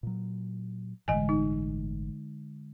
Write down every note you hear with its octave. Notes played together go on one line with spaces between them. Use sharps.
A#2 F#3
G1 A2 D3 E3 G#3 D#5 G#5
D#4